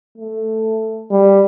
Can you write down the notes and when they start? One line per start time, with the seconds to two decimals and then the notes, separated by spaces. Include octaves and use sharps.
0.18 A3
1.11 G3